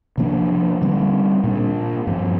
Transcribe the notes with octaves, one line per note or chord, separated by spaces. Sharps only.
C3 F3 A#3 D4
D3 G3 C4
A#2 A#3 D4
G2 F3 C4